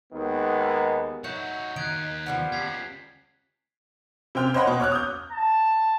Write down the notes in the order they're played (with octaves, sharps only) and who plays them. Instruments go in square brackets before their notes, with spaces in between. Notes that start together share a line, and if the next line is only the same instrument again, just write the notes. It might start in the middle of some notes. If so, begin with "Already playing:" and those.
[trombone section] D#2 D#3 G#3 B3
[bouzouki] F#3 [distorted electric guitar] D#4 E5 [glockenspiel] G6 C#7
[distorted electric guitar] D#2 [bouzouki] D#4 [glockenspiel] F#6 G#6 D7
[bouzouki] F3 G3 B3
[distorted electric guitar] C#4 F4 [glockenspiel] G#6 B6 C7
[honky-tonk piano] C3 C5 G5 F6
C5 C#5 D#5 F#5 B5
B2
C#5 D6 F6 F#6
D#6 G6
[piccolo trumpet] A5